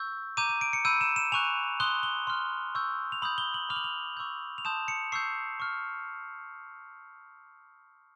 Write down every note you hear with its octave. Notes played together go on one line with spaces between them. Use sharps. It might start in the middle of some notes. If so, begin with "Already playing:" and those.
Already playing: C#6 E6 G6
A#5 D6 G6 D#7
D#7
D7
C#7
B5 E6 G6 D#7
E7
E7
G#5 C#6 F#6 F7
C6 D#6 F#6 G7
G7
C6 F6
C#6 E6 G6
F7
B5 D#6 G6 F#7
G7
F#7
B5 D6 F6 F7
F#7
F7
C#6 E6 G6
F7
A5 C6 D#6 G6 E7
C#7
C#6 E6 G6 C7
C#6 F6